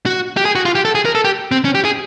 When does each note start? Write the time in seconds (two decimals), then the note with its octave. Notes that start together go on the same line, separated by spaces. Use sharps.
0.06 F#4
0.37 G4
0.45 G#4
0.55 F#4
0.65 F4
0.75 G4
0.85 A4
0.95 G#4
1.05 A#4
1.15 A4
1.25 G4
1.52 C4
1.65 C#4
1.75 G4
1.85 G#4